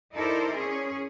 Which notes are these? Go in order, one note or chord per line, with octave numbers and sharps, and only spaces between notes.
D#4 E4 A4 A#4 C5 D5
C#4 G#4